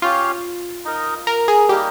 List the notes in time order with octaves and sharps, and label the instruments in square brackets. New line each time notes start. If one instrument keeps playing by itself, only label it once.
[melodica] C#4 G4 C#5 F5 [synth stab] F4
[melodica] D#4 A#4 D#5
[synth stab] A#4
G#4
[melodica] G3 A#3 D#4 A#4 [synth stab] G4